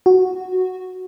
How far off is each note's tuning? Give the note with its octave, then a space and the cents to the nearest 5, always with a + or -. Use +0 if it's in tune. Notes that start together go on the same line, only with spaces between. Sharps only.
F#4 -5